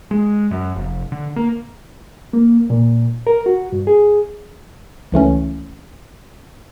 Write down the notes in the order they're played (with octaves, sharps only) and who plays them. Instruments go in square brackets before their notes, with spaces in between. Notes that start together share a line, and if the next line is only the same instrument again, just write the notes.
[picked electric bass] G#3
F#2
F1
D3
A#3
[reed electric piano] A#3
A#2
A#4
F#4
G2
G#4
[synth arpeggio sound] C#2 E3 A3 C#4